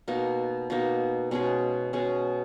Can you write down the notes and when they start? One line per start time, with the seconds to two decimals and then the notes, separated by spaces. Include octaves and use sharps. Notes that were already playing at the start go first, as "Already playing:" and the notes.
0.08 B2 A#3 D#4
0.70 B2 A#3 D#4
1.31 B2 G#3 C#4 G#4
1.93 B2 G#3 C#4 G#4